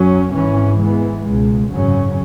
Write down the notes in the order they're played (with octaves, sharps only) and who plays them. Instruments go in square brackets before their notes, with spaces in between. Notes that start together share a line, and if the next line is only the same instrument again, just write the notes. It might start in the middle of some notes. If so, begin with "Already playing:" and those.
Already playing: [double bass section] F#2 F#3 C#4
G#1 G#2 E3 C#4
G#2 E3 G#3 B3
C#2 B2 G#3
G#1 F#2 C#3 F#3 C#4